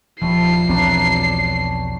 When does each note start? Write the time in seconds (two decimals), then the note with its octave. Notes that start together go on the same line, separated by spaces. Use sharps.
0.22 D#1 F3 G3 A3 B5 C7
0.69 B1 E2 C4 D4 D#4 C#5
1.21 A5